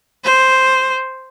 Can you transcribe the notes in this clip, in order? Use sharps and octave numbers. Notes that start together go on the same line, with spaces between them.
C5